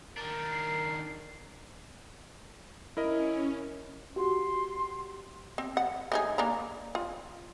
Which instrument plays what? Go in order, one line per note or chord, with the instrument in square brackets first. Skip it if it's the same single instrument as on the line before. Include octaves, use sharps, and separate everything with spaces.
[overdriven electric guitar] D#3 D4 [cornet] A#4 [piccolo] A6
[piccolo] C7
[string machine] C#4 [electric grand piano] E4 A#4 D#5
[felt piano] F#4 G4 [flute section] C6
[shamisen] C4
F#5
A3 D#4 G#4
A#3 D4 A#5
F4